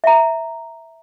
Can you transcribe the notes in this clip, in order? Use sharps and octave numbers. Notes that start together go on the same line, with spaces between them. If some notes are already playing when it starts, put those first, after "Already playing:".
E5 A#5